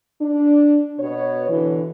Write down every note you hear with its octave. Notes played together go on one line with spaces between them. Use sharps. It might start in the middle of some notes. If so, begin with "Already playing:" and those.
D4
B2 C#5
B2 D3 E3